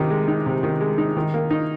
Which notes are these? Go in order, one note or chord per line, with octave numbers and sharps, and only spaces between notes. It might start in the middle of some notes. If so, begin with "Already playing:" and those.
Already playing: C3 D#3
G#3
D#4
C3
D#3
G#3
D#4
D#3
A#3
D#4